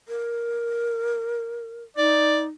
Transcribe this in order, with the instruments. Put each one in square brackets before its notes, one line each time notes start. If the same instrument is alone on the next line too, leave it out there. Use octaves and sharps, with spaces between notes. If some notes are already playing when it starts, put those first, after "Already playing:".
[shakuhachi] A#4
[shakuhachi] D#4 [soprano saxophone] D5